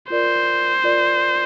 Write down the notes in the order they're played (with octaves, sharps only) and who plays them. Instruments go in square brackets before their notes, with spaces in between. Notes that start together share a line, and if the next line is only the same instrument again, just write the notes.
[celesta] F4 A#4 D5 [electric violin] C5
[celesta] F4 A#4 D5